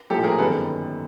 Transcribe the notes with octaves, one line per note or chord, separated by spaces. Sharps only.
A#1 A2 F3 G4 A4
G#4 A#4
G1 F#2 D#3 G3 A4 B4